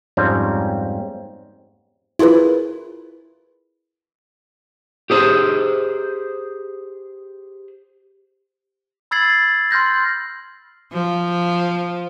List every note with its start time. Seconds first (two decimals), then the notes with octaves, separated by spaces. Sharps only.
0.17 F2 G#2 G3 C4 C#4
2.19 E4 F4 G#4 A#4 B4
5.10 G4 G#4 C5
9.11 B5 E6 G#6 A6 C7 F#7
9.71 C6 F6 G6 A#6
10.93 F3